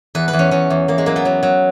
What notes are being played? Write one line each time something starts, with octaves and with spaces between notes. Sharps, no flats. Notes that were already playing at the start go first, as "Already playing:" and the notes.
E2 B4
B4
E2
C#4
E2 C#4
E2
E2 A#3
G#3
F#3 A#3
B3
F#3
F#3